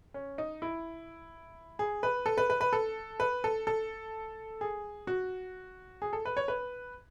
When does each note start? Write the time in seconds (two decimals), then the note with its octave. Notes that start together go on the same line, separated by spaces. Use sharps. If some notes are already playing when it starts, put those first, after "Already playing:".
0.14 C#4
0.38 D#4
0.62 E4
1.79 G#4
2.03 B4
2.26 A4
2.38 B4
2.50 B4
2.61 B4
2.73 A4
3.20 B4
3.44 A4
3.67 A4
4.61 G#4
5.07 F#4
6.02 G#4
6.13 A4
6.25 B4
6.37 C#5
6.48 B4